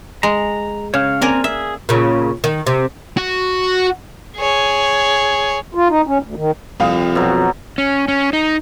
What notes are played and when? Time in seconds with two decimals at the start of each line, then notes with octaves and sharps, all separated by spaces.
0.23 G#3 A#5
0.94 C#3 C#5 F5
1.21 A#3 C4 A#4 D5 G#5 A#5
1.44 G#4 E5
1.89 A#2 C#3
2.44 D#3
2.67 C3
3.17 F#4
4.37 G#4 C#5
5.75 F4
5.89 D#4
6.07 C#4
6.22 D2
6.36 D#3
6.80 C2 F2 F4 D#6
7.15 B2 F#3
7.78 C#4
8.08 C#4
8.33 D#4